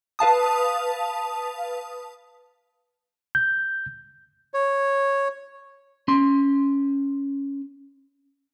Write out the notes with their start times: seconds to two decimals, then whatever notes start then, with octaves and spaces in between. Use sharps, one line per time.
0.19 B4 F5 A5 D#6
3.35 G6
4.54 C#5
6.08 C#4 C6